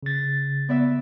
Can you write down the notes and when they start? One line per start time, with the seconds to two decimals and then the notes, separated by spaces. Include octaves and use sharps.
0.03 C#3 A6
0.69 B3 D5 E5